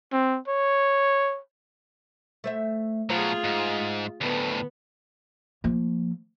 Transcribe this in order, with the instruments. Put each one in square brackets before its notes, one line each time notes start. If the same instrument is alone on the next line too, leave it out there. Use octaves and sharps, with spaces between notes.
[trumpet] C4
C#5
[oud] A3 C5 E5
[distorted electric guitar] B2 F#3 [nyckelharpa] F4 G#4 [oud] C5
[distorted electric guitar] G#2
[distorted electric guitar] D2 A2 [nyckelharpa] B3
[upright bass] F3 A#3